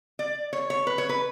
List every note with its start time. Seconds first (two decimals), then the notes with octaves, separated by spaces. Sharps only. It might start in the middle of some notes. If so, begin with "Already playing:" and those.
0.19 D5
0.53 C#5
0.70 C#5
0.87 B4
0.98 C#5
1.09 B4